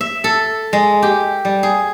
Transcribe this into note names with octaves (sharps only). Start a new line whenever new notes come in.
E5
A4
G#3
G4
G3
G#4